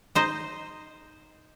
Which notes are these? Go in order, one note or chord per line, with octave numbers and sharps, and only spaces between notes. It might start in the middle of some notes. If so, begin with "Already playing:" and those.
D#4 C5 D#5